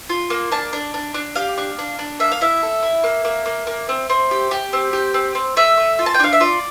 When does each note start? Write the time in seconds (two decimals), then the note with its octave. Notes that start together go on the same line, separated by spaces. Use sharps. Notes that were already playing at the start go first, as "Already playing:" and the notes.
0.09 F4
0.30 A#3
0.52 D4 A5
0.73 D4
0.94 D4
1.14 D4
1.35 G4 F5
1.58 D4
1.79 D4
1.99 D4
2.20 A#3 E5
2.32 F5
2.41 E4 E5
2.63 A4
2.83 E4
3.04 A#3
3.25 A#3
3.46 A#3
3.67 A#3
3.89 C4
4.10 C4
4.31 G4
4.51 G4
4.73 C4
4.93 G4
5.14 C4
5.35 C4
5.57 A3 E5
5.77 A3
5.99 F4
6.06 A5
6.14 G5
6.20 D4 F5
6.33 E5
6.40 F4 D5